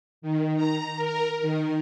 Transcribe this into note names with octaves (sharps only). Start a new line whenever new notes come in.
D#3
A#5
A#4
D#3